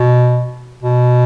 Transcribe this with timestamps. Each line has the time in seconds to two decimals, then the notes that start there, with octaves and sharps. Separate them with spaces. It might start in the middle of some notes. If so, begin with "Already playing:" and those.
Already playing: B2
0.82 B2